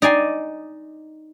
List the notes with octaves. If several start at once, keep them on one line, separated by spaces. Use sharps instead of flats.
D#4 D5 G#5 C6